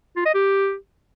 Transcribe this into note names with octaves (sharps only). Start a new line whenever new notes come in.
F4
D#5
G4